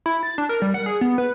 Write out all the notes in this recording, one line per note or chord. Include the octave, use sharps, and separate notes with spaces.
E4
A6
D4
A#4
G3
F#5
G#4
B3
B4